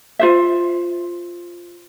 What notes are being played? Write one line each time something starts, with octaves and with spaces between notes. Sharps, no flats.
F4 C5 E5